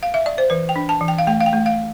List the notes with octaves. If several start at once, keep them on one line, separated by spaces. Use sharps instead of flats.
F5
E5
D5
C5
E3 B4
G5
D4
A5
E3
G5
F5
A3 G5
F5
G5
A3
F5